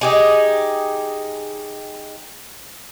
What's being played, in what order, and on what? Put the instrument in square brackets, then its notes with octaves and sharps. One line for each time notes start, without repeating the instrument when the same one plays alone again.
[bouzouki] D#4 G4 G#4